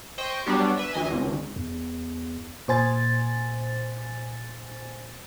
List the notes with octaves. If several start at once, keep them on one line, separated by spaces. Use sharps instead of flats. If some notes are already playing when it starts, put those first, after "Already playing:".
C5 D#5 G5 C#6
F#3 G3 B3 D4 F#4 G4
B4 E5
D2 E3 D#5 G#5
G#1 C#2
E2
A#2 C5 G#5 A6